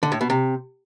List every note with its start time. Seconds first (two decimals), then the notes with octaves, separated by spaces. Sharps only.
0.03 D3
0.12 A2
0.21 B2
0.30 C3